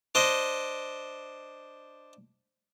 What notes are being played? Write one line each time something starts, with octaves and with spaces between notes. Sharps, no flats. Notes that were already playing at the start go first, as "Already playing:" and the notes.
D4 C5 D#5